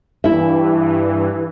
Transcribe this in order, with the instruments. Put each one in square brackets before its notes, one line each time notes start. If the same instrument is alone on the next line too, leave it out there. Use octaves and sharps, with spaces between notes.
[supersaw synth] G2 E3 [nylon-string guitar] E4 E5